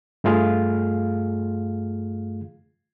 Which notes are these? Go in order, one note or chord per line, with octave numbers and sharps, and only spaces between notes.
G2 A3 F4 G#4 F5 F6